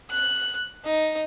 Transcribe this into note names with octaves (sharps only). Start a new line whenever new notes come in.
F#6
D#4